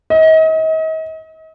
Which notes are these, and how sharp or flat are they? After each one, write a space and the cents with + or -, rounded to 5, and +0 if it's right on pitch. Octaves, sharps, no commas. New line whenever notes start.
D#5 +40